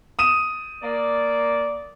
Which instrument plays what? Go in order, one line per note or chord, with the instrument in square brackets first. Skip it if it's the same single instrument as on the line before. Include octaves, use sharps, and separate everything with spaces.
[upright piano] D#6 D#7 E7
[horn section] A#3 D5